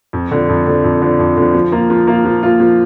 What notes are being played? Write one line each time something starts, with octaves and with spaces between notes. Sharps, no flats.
F2
D3 F3
F2
D3 F3
F2
D3 F3
F2
D3 F3
F3
A#3 F4
F3
A#3 F4
F3
A#3 F4
F3